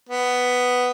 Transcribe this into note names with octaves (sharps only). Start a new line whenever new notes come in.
B3